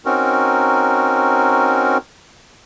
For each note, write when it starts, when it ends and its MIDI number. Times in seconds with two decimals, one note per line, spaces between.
0.05 1.97 60
0.05 1.97 61
0.05 1.97 63
0.05 1.97 66
0.05 1.97 70